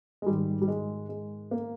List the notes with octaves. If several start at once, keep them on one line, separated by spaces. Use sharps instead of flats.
G#3
G#2 D#3 G3
G3
G#3
G#3
A#3